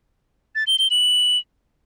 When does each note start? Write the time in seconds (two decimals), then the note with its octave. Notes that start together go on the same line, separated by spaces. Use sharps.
0.55 A6
0.67 G7
0.79 G7
0.91 F#7